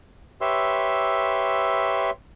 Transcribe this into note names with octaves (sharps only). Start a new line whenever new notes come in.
G4 B4 C#5 E5 C6 E6